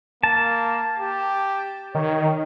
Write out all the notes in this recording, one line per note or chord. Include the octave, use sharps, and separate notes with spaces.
A#3 A5
G4
D#3 C#5